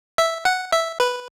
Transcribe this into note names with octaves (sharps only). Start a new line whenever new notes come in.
E5
F#5
E5
B4